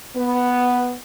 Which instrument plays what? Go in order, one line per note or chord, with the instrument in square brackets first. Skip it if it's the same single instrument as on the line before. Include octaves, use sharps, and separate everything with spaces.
[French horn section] B3